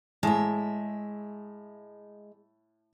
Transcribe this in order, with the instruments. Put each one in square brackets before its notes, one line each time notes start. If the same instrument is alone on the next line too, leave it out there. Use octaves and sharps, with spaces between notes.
[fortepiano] A2 [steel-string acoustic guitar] G#3 E5